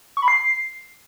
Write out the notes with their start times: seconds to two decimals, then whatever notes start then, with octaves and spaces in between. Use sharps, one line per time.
0.17 C#6
0.22 B5
0.28 C7